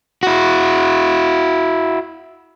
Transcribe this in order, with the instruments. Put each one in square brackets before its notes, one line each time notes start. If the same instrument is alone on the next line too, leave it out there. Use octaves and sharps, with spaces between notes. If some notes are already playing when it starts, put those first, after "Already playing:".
[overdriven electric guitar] E4 F#4